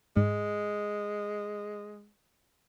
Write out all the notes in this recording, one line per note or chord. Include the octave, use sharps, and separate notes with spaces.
G#2 G#3